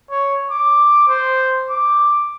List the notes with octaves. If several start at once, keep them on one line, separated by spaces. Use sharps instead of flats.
C#5
D6
C5
D6